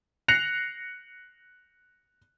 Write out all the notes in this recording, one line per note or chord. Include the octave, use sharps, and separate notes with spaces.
F#6 A#6 C7 C#7 F7